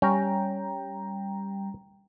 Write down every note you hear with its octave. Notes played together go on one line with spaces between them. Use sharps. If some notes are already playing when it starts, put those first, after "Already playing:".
G3 C#4 G5 A#5